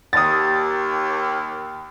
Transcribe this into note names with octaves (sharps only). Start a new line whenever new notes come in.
D#2 D#6 A6